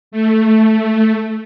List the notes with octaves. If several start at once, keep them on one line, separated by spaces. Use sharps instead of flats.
A3